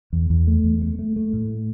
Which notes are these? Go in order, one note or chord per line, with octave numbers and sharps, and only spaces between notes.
E2
E2
A3
E2
A3
A3
A3
A2